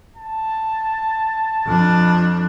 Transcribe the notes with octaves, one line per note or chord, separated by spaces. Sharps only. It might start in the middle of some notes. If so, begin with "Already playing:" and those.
A5
F2 D4